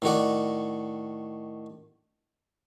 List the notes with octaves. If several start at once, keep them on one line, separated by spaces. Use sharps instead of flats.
A2 D#3 F#4 D5